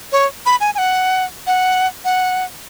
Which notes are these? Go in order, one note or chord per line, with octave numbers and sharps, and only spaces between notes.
C#5
B5
G#5
G#5
F#5
F#5
F#5